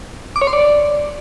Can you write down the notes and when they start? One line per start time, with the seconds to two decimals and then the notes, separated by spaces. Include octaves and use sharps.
0.36 D6
0.41 C#5
0.47 C6
0.53 D5